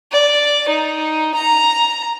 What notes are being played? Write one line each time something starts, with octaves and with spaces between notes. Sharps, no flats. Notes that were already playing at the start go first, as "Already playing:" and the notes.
D5
D#4
A#5